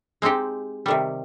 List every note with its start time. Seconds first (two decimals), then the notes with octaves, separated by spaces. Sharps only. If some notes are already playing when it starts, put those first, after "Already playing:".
0.22 G#3 C4 D#4 G4
0.86 C3 D#3 G3